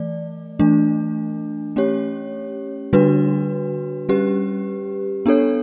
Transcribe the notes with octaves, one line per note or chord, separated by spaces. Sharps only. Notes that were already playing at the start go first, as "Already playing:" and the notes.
Already playing: E3 A3 D5
E3 A3 D4
A3 C#4 G4 C#5
D3 G3 D4 F#4 B4
G3 C#4 G4 B4
B3 D4 A4 C#5